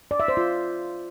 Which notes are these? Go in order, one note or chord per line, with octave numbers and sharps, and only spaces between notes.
D5
E5
C5
F4